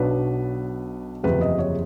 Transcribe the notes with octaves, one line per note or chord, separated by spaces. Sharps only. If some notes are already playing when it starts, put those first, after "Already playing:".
Already playing: B1 B2 F#3 B3 D4 B4
F#1 E2 C3 F3 B4
D#5
C#5